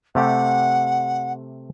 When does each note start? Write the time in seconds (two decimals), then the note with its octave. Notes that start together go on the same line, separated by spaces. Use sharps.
0.15 C3 A3 G4 F#5